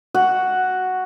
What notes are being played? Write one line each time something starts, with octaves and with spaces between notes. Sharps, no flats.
F#4 F#5